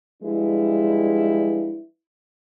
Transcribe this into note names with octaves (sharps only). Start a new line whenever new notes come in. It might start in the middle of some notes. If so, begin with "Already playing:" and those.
F3 G3 G#3 D4 E4 B4